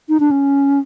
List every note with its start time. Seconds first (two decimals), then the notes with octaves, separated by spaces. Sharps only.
0.09 D#4
0.20 D4
0.31 C#4